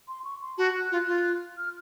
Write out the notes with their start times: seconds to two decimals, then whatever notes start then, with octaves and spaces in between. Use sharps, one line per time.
0.08 C6
0.24 C#6
0.41 C6
0.58 F#4 A5
0.74 F#6
0.92 F4
1.07 F4
1.58 F6